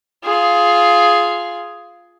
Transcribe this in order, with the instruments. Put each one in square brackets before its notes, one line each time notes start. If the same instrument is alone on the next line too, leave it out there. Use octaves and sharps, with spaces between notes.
[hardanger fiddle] F4 G#4